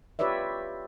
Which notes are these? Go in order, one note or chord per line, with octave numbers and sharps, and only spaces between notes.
F4 G4 B4 C#5 D5 E5